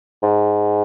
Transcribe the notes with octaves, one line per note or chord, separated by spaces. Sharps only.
G#2